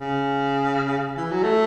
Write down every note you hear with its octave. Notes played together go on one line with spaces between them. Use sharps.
C#3
E3
F#3
A3